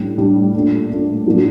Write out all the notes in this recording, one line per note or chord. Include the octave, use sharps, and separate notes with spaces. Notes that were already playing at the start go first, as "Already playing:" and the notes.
Already playing: A2 G3 D4
A2 G3 D4
A#2 A3 D4
A#2 A3 D4
A2 F#3 A#3 D4